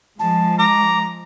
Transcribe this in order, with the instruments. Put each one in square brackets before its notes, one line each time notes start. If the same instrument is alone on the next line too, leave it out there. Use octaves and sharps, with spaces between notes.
[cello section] F3 G#3 [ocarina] A5
[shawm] A#5 [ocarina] D6